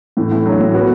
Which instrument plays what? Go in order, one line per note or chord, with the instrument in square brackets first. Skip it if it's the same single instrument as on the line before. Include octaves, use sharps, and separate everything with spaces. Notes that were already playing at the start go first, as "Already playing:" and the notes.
[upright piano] A2 [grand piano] E3
[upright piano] A2
[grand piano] F#3 [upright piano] D4
[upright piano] A2
[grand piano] B3 [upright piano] F#4